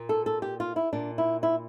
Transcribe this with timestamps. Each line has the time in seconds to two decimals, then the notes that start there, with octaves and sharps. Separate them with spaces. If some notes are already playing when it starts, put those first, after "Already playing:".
Already playing: A#2
0.09 A4
0.26 A4
0.42 G4
0.60 F4
0.76 E4
0.93 A#2 D4
1.18 E4
1.43 E4